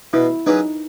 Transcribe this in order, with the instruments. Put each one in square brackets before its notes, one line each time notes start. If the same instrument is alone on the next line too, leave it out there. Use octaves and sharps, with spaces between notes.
[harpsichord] B2 [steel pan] E4
[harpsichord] F#3 C#4 G#4 B4 [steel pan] D#4